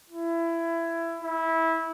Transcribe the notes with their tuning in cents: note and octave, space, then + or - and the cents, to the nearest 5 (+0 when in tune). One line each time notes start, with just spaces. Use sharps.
E4 +20
E4 -20